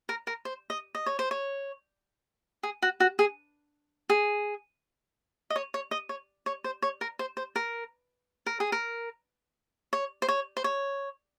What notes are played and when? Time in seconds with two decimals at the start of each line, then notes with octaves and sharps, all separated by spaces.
0.09 A#4
0.27 A#4
0.45 C5
0.70 D#5
0.95 D#5
1.06 C#5
1.19 C5
1.31 C#5
2.63 G#4
2.82 F#4
3.00 F#4
3.19 G#4
4.10 G#4
5.50 D#5
5.56 C#5
5.74 C#5
5.91 D#5
6.09 C#5
6.46 C#5
6.64 C5
6.82 C#5
7.01 A#4
7.19 C5
7.37 C5
7.56 A#4
8.46 A#4
8.60 G#4
8.72 A#4
9.93 C#5
10.22 C5
10.28 C#5
10.57 C5
10.64 C#5